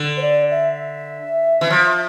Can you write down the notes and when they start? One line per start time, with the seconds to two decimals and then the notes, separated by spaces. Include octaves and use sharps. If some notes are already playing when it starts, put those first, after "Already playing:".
Already playing: D3
0.17 C5
0.22 D5
0.51 E5
1.61 E3
1.70 F3